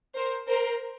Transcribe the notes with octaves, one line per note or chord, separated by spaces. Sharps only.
A#4 C5
A#4 C5